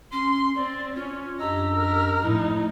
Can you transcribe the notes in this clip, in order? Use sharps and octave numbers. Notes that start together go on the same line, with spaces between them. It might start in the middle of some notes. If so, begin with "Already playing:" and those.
C#4 C6
C4 D5
C#4 F4
F#2 D4 G4 D#5 A#5 E6
G4 A#4
A2 F3 D#4 E4